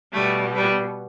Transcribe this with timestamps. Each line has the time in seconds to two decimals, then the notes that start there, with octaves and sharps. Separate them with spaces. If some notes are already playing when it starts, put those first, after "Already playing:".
0.13 B2 G3 A3
0.55 G3 B3